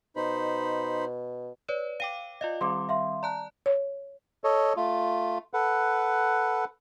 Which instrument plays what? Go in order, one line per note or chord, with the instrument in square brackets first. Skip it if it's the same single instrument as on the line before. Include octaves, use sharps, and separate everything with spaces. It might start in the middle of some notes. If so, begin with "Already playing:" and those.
[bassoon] B2 [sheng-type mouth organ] D#4 C5 B5
[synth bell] B4 C#5 [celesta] D5
[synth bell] F5 G5 D6 [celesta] D#7
[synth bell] F4 D5 F5 [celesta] D#5
[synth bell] D#3 G3 C4 [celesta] C6 D6
[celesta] E5 F5 C6
[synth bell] D5 A5 F#6 [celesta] A#5
[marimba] C#5
[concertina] A4 C#5 D#5
A3 F4
A4 B4 F#5